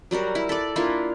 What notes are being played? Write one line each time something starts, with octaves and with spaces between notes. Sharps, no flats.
F#3 G3 F#4 A#4
E4
A4 D5
A#3 D4 E4 F4